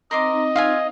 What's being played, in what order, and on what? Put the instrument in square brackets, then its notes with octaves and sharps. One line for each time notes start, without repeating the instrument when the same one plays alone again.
[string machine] C4 D#4 [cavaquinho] A#4 C6 D6 [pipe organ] D#5
[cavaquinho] F4 E5 G#5 [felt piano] F5